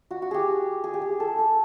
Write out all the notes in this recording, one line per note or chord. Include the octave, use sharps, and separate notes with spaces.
F#4
F#4
G4 G#4
G#4
G4
G#4
A4
A4